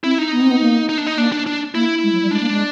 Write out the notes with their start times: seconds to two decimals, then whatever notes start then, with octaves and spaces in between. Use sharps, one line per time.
0.04 C4 E4
0.18 D#4
0.33 B3
0.41 C4
0.51 B3
0.61 A#3
0.89 D#4
0.98 D4
1.07 D#4
1.17 A#3 D4
1.32 D4
1.46 D4
1.75 A#3 E4
2.03 G#3
2.13 F#3
2.22 G3
2.31 G#3 D4
2.41 A#3
2.51 G#3